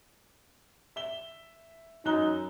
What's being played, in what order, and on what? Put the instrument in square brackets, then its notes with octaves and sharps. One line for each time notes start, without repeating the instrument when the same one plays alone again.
[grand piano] E5 G7
[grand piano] F#2 F#6 G7 [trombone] D#4